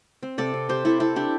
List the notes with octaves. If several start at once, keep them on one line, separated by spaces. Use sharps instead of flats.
C4
C3 A4 D5
C3
C4 G4 C5
C3 E4 A4
C4 E4 A4
C4 D4 G4